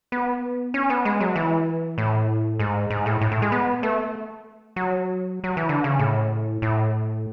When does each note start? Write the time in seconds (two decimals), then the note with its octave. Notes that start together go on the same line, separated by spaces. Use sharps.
0.12 B3
0.74 C#4
0.90 B3
1.05 G#3
1.21 F#3
1.36 E3
1.98 A2
2.59 G#2
2.90 G#2
3.06 A2
3.21 A2
3.32 A2
3.42 G#3
3.52 B3
3.83 A3
4.76 F#3
5.44 F#3
5.57 E3
5.69 D3
5.84 C#3
5.99 A2
6.62 A2